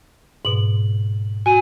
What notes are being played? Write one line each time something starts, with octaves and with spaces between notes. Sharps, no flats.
G#2 B2 F#7
F#4 G#5 D#7